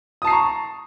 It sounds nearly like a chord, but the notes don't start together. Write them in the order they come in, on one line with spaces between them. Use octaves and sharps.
D#6 A5 C7 A#5 C#6